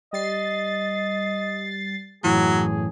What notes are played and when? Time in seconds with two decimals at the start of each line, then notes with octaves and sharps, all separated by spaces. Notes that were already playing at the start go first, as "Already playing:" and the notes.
0.13 G3 D#5 A6 C7
2.24 F#2 A2 E3 F#3 G#4